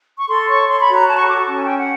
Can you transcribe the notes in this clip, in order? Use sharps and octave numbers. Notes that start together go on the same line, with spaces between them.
C#6
A4 C6
C#5 C#6
C#5 C6
B5
F#4
A#5
A4 A5
C#6
A4 D6
C#6
C#4 A5
G#5
A4 G5
F#5